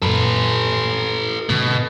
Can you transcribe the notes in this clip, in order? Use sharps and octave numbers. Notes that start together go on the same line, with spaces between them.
F#2 A#2 A4 B4
G#2 B2 D3